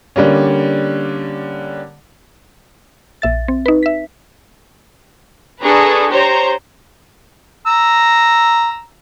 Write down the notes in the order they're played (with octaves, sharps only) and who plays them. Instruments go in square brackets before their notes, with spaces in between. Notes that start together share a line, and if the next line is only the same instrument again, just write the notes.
[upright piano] D3 G3 A#3 C#4
[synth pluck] A#1 E5 A6
C4
D#4 B4
E5 B6
[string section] D4 G#4 A4 B4 A#5 C#6
G4 C5 C#5 A#5
[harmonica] A#5 E6